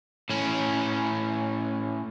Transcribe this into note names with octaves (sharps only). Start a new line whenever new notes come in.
A2 C#4